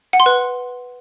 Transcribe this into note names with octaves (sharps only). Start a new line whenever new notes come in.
F#5
C6
B4